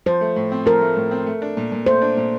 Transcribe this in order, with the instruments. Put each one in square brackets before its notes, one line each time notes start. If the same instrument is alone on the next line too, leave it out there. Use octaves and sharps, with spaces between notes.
[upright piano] F3 [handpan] C5
[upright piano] A3
A2
C4
[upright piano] F3 [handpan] A#4
[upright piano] A3
A2
C4
A3
D4
A#2
A#2
[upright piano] A3 [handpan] C5
[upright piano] D4
A#2